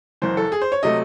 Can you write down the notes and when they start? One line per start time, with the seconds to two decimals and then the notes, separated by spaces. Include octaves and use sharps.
0.22 F#1 F#2 E3 C5
0.37 A4
0.52 G#4
0.62 C5
0.72 C#5
0.83 C3 F#3 A3 D#5